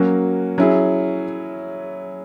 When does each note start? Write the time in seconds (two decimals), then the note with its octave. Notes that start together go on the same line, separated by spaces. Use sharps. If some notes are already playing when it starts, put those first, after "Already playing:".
Already playing: F#3 A#3 C#4 F#4
0.58 F#3 C#4 E4 G#4